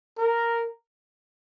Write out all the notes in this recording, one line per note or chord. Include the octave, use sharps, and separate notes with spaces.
A#4